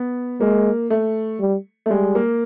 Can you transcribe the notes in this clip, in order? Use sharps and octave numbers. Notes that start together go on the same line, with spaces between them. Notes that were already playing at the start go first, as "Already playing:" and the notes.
Already playing: B3
G#3 A#3
A3
G3
A3
G3 G#3
A#3